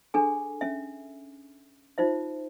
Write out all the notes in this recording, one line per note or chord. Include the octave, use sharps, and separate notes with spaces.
D4 G#4 A4 G#5
C#4 E5
D#4 F4 C5 E5